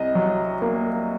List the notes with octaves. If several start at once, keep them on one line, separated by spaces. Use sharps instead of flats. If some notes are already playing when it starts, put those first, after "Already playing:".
Already playing: C2 D#5
F#3
A#3